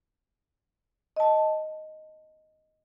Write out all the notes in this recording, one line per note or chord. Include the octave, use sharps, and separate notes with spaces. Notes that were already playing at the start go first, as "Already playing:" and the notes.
D#5 A5